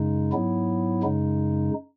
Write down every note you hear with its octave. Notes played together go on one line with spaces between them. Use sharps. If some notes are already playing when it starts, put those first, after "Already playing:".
Already playing: F#2 C#3 G#3 D#4
G#2 F#3 B3 E4
F#2 C#3 G#3 D#4